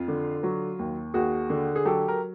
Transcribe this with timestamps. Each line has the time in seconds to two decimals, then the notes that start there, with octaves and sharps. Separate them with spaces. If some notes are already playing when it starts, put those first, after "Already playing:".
Already playing: F2 F4
0.08 D3
0.43 F#3
0.79 D#2
1.14 D#2 F#4 G#4
1.50 D3
1.76 G#4
1.85 F#3 G4 A4
2.08 A#4